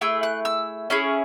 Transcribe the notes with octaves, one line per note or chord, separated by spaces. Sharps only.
A3 E4 G#4 E6
F#6
E6
C#4 E4 G#4